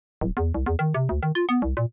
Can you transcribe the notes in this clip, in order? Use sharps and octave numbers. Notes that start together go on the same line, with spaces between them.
D1
E2
C2
E2
D#3
C3
D2
D#3
F4
B3
C2
A#2